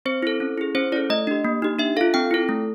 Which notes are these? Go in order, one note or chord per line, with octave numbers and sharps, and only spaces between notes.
C4 C5
E4 A4
C#4
E4 G#4
C#4 C5
E4 A4 D5
A3 D#5
D4 G4
A#3
D#4 G4
D4 E5
F4 A4 F5
C4 G5
E4 A4
A3